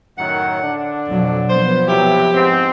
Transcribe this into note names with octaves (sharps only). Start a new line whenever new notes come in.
F#2 A2 D#3 F#3 F#5
D3 D4
F2 B2 F#3
F3 B3 C5
C3 F#3 E4 G4
G#2 C4